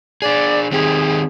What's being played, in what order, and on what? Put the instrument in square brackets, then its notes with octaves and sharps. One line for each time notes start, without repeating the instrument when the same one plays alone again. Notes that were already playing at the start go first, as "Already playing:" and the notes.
[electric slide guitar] D4 G#4 [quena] D5
[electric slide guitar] D#3 C4 G4 [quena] G#4